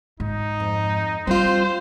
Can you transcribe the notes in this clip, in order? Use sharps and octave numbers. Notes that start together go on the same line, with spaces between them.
G#2 D#4
F2
G3 C4 F4 C5